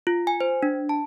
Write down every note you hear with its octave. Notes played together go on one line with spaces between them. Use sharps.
F4
G#5
C5
D4
A5